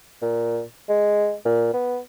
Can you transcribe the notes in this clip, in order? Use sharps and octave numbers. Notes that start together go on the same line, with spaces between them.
A#2
G#3
A#2
B3